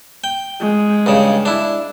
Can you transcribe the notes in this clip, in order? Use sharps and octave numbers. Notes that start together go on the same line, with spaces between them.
G5
G#3
G2 C#3
D4 E4